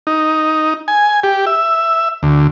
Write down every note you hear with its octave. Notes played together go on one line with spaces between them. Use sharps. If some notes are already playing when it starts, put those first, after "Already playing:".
D#4
G#5
G4
E5
D2